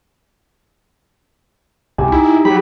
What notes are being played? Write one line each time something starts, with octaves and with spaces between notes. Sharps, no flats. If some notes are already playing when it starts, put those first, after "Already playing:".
C2 G4 G#5
D#4 E4
F#3 G4 B5